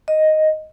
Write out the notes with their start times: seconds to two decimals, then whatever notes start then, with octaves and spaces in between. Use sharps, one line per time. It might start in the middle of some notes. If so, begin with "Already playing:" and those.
0.08 D#5